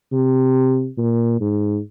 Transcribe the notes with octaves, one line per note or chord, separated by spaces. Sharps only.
C3
A#2
G#2